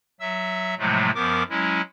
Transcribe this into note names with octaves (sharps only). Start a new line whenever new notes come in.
F#3 E5 E6
A2 C3 F3 F#3 G#3 A3
F#2 F3 B3 A#4 D6
F#3 G#3 C#4 E4